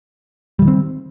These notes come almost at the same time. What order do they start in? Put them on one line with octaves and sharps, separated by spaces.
G3 E3 D#3 C4